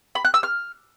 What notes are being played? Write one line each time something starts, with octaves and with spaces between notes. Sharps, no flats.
B5
F#6
E6
F6